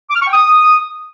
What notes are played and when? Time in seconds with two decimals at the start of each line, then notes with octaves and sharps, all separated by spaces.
0.10 D6
0.15 F6
0.21 C#6
0.27 G5
0.33 D#6